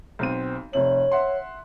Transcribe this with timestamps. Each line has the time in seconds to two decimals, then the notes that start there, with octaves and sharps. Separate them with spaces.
0.19 B1 C4 D#7
0.73 F1 C3 C#5 F#7
1.12 E5 F#5 C6